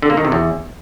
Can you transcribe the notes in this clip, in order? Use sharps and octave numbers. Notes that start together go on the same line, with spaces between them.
D3
A#3
D#3
C3
E2